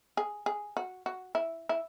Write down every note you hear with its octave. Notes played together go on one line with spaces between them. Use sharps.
G#4
G#4
F#4
F#4
E4
E4